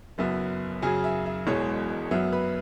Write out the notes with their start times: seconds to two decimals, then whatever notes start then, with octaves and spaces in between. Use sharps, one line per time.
0.18 F#1 F#2 F#3 B3 E5
0.82 F#2 C#3 F#3 G#4 G#5
1.04 E5
1.26 E5
1.47 E1 E2 B2 G#3 C#5
2.11 F#2 F#3 B3 E5
2.32 B4 B5